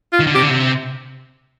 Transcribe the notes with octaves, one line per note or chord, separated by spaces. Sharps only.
F4
D#3
D3
C3 G4
D3
C3